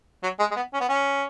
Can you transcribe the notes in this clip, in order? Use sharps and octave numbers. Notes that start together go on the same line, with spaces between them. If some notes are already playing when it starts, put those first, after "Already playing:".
F#3
G#3
G#3
B3
C#4
B3
C#4